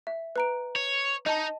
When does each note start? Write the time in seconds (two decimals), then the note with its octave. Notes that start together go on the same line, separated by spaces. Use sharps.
0.07 E5
0.36 B4 A#5 D7
0.76 C#5
1.26 D#4 D#5 A5